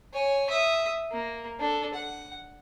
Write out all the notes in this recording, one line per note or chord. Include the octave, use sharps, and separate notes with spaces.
C#5 G#5
E5 D#6
A#3
D4 A4
F#5